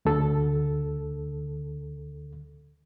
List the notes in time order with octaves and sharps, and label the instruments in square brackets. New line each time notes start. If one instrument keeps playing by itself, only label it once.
[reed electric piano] D2 D3 A4